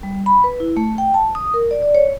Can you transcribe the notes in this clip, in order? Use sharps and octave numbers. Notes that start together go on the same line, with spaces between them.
G3
B5
B4
E4
A3
G5
A5
D#6
A#4
D5
D5
C#5